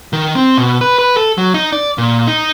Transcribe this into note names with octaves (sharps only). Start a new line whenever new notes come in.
D#3
C4
B2
B4
B4
A4
F#3
D#4
D5
A#2
D#4